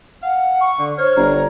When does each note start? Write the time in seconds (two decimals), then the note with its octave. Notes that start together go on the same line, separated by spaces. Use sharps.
0.23 F5 F#5
0.61 C#6
0.79 D3
0.98 C5 C#5 F6
1.16 G1 A#5